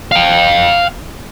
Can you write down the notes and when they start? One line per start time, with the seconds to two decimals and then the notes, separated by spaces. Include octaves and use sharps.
0.11 F5 G5